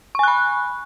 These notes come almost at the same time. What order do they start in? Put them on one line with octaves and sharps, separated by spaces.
C#6 G#5 F#6 B5